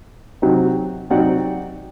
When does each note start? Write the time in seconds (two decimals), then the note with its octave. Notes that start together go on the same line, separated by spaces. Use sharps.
0.42 C3 F#3 C4 D#4
1.10 C3 F#3 C4 D#4 D5 F#5